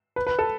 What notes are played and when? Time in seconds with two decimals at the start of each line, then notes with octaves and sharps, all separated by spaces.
0.16 B4
0.27 B4
0.39 A4